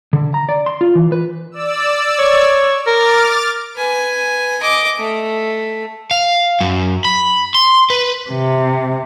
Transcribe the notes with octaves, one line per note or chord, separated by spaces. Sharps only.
D3
A#5
D5
C6
F4
E3
B4
D5 E6
C#5
A#4 D6 F6 A6
B4 G#5
D#5 D6
A3
F5
F#2
B5
C6
B4
C3